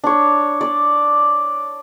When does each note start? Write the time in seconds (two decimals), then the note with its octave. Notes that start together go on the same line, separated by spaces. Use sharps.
0.04 D4 C#5
0.61 D5